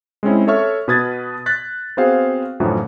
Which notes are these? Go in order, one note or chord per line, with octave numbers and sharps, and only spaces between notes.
G#3 C4 C#4 E4
A4 C#5 E5 C#6 F6
B2 B3 B4 D#6 G#6 A6
F#6 A6 B6
B3 C4 F#4 G#4 C5 F5
F#2 A2 D3 E3 F3